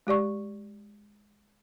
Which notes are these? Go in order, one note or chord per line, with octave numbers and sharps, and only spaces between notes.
G#3 G4 D5 C#6